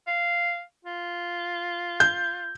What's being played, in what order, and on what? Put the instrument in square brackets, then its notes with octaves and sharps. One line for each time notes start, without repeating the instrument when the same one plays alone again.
[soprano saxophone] F5
F4
[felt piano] G6